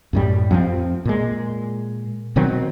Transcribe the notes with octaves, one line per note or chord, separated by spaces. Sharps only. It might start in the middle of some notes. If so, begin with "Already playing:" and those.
F#2 A2 G3
F2 F3 C4
A#2 G#3
B2 D#3 F#3 C4